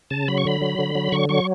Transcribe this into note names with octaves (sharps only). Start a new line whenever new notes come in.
C#3 A5
F#3 B5
C#6
D3 B5
F#3
D3
F#3
D3 C#6
F#3 C#6